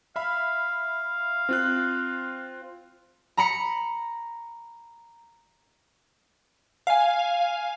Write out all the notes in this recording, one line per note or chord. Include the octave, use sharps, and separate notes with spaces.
E5 F5 B5
C4 F4 F#6
A#5 B5 C#7
F5 G#5